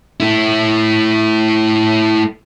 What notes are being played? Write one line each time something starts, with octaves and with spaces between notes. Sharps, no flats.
A3 E4